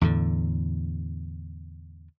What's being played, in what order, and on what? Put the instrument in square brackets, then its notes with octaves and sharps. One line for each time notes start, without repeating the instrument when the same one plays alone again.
[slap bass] E2 A2 D3